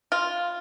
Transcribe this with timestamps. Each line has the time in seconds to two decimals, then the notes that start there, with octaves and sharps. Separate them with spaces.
0.12 F4